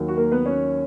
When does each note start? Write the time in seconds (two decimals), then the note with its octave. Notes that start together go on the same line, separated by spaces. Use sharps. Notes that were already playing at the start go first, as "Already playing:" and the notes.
Already playing: D#2 D#3 F#3
0.08 F#4
0.17 A#3 A#4
0.32 B3 B4
0.46 C#4 C#5